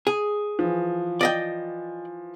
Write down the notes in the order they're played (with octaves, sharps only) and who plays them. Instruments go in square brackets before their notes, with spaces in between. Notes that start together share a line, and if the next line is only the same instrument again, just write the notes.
[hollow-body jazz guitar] G#4
[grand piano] E3 F3
[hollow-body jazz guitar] D5 D#5 G5